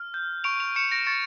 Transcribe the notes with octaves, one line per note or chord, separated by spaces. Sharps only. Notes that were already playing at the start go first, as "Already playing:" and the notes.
Already playing: F6
G6
C#6 D7 F7
D7 F7
C#6 C#7 E7
A#6 D7
C#6 A6 C#7